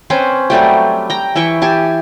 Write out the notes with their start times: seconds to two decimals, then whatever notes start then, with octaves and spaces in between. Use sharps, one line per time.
0.10 C4 C#4 B4 C5
0.50 F#3 G3 A3 G4
1.10 G5 A#5
1.35 E3 E4 G5 C#6
1.62 G4 G#5 A5